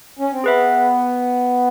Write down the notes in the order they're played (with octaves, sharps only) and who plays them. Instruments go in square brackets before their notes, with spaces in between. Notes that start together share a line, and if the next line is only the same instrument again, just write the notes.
[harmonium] C#4
C4
[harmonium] B3 [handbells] G#4 B4 E5